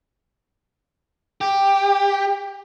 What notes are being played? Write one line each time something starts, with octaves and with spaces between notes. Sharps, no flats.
G4